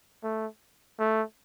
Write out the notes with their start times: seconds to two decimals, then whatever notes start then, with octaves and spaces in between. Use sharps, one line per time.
0.24 A3
0.99 A3